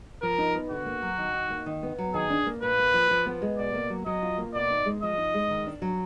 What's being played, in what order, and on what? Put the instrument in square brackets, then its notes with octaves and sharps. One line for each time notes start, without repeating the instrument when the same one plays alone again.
[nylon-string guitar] F3 [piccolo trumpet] A#4
[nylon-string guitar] D#4
B3
[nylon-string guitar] D3 [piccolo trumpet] F#4
[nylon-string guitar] A#3
F#3
D#3
D#4
A#3
D#3
B3
F#3
[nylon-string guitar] D#3 [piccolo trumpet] G#4
[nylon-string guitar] D4
A#3
[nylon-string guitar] A#2 [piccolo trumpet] B4
[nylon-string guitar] A#3
F3
F3
B3
G#3
[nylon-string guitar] B2 [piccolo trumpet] D5
[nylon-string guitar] A#3
F#3
[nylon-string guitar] F#3 [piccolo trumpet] D#5
[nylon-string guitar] F4
A#3
[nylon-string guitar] B2 [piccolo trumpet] D5
[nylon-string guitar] D#4
G#3
[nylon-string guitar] F3 [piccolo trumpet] D#5
[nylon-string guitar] D#4
G#3
D#3
D4
F#3